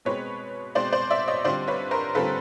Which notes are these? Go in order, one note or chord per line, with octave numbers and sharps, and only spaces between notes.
B2 G#3 C4 B4 C#5
B2 G#3 C4 C5 D5
C5 D5
D5 E5
C#5 D#5
D3 G3 C4 F4 C5 D5
B4 C#5
A#4 C5
D3 G3 C4 F4 A4 B4